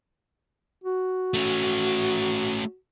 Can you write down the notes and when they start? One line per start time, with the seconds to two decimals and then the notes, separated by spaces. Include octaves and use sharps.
0.84 F#4
1.34 A3 C#4